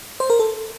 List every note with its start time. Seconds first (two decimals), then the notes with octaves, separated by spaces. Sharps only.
0.20 C5
0.30 A#4
0.39 A4